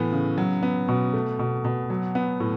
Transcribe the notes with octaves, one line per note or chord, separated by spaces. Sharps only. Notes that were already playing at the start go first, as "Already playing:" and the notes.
Already playing: A2 E3 B3
C#3
F#3
B3
B2
A3
B2
B2
F#3
B3
A2